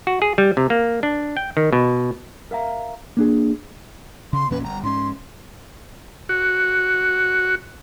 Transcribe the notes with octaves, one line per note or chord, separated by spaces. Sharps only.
F#4
G#4
G3
C3
A#3
D4
G5
D#3
B2
A#4 E5 F5 A#5
A#3 D4 G#4
C#3 C6
E2 A#2 C#4 B4
G1 A#5
G#2 A3 C#4 C6
F#4